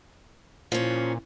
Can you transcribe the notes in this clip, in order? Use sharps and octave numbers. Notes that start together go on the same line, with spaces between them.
A#2 F3 C#4